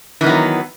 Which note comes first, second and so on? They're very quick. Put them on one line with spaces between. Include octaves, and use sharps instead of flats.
E3 D#3 B3 F#3